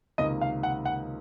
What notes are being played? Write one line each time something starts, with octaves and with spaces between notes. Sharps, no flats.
C#2 C3 D#3 A#3 D#5
F5
F#5
F#5